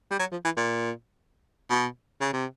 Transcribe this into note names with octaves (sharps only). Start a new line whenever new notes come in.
G3
F#3
F3
E3
A#2
B2
C#3
C3